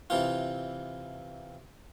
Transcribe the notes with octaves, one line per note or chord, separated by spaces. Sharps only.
C3 E3 F4